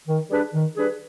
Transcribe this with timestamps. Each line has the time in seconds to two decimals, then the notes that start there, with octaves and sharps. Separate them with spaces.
0.07 D#3
0.30 G3 D4 G#4 B4
0.53 D#3
0.76 G3 D4 G#4 B4